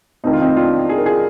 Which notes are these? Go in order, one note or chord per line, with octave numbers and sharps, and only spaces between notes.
F1 F2 D#3 D#4
F4
C4 D#4
D4 F4
G#4
A#4
F4 G#4